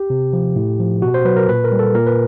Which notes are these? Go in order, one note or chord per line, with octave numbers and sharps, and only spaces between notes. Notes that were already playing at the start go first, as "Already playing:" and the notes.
Already playing: G4
C3
F3
A2
F3
B2 F#4
C5
F#3 B4
A#4
A#2 B4
A#4
G3
A4
A#2 A#4
B4